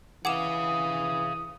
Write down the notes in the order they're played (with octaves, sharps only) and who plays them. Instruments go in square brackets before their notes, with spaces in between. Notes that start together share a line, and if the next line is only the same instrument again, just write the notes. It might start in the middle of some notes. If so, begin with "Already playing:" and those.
[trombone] E3 [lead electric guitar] G#4 F5 [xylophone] F#5 D6 E7 [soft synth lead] D#6